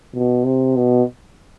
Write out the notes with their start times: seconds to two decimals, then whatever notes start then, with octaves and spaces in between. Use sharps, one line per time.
0.15 B2
0.45 C3
0.76 B2